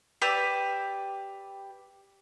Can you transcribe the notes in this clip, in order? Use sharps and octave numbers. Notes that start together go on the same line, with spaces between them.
G4 B4 D5 E6